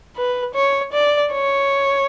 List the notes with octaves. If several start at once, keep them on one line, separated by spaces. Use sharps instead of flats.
B4
C#5
D5
C#5